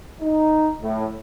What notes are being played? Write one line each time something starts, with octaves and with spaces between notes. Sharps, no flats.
D#4
A2